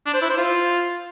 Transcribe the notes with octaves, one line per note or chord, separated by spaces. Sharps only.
D4
C5
E4
C5
F4